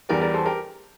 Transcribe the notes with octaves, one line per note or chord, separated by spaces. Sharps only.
E2 E3 G3 A#4 D5
A#4 D5
A4 C5
G4 A#4